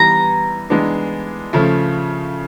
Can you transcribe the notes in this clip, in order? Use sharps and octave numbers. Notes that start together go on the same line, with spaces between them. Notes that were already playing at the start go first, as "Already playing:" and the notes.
Already playing: E3 G3 B3 A#5
E3 G#3 B3 D4
C#3 F3 A3